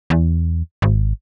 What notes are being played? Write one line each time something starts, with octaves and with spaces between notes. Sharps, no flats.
E2
G#1